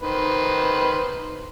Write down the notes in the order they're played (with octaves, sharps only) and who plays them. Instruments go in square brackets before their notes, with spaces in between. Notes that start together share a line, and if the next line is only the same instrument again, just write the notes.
[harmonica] D#3 B4 C5